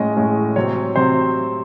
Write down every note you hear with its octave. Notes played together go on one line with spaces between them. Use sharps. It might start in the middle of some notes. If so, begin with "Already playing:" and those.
Already playing: A2 G#3 C#4 D#5
A2 G#3 C#4
C3 F#3 C4 C#5
C3 F#3 C4 C5